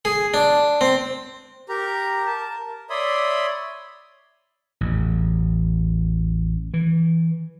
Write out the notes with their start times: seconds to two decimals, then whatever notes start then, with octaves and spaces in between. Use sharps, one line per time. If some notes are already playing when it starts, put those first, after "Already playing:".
0.05 G#4
0.34 D4
0.81 C4
1.69 G4 A#4 A#5
2.27 A#4 A5
2.66 A#4
2.90 C#5 D5 E5 B5 C6 D#6
4.81 A1 E2
6.74 E3